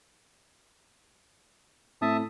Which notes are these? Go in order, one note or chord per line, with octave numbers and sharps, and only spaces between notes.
A2 C4 E5 A5 D#6